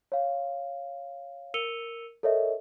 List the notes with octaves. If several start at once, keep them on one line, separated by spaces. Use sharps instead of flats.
C#5 F5
A#4 E6 C#7 D#7 F7 G7
A4 A#4 C#5 D#5 E5